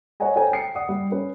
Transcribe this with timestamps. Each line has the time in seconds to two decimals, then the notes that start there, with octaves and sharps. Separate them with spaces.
0.20 C#5 D#5 F#5 G#5 A#5
0.36 A4 C5 C#5 G5 G#5 A#5
0.52 G5 C7 C#7
0.75 D5 F#5 D#6
0.89 G3
1.11 C#4 B4